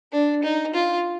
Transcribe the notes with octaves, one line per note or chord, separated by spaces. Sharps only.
D4
D#4
F4